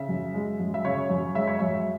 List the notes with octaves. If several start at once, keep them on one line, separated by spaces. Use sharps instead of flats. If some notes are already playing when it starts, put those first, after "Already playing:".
Already playing: C#3 E5
F#2
G#3
F#2
E5
C#3 C#5
F#2
G#3 E5
C#5
F#2 E5